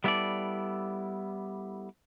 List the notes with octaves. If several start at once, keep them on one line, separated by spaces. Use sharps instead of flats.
G3 B3 E4 G#4 A4 D5